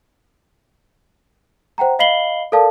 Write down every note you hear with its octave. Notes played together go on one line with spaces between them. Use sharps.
C5 F#5 G5 A#5
D#5 F5 B5 C7 F#7 G7
A4 A#4 D5 F5 A5